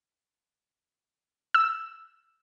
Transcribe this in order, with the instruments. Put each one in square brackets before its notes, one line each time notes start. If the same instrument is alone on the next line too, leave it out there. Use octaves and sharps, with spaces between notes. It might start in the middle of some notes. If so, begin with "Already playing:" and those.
[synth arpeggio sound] E6